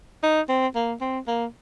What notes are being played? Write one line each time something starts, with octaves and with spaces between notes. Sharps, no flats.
D#4
C4
A#3
C4
A#3